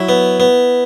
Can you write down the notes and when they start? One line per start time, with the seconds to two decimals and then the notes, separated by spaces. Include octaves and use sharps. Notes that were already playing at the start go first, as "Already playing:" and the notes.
Already playing: F#3 E4
0.09 B3
0.40 B3